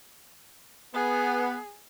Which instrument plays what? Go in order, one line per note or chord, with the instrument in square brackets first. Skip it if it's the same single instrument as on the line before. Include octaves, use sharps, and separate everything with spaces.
[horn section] B3 [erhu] G#4